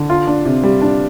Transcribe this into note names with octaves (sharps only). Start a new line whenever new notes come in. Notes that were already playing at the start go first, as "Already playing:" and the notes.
Already playing: D3
F4
D4
C3
G3
D4